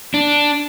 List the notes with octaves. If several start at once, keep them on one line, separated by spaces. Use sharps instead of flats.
D4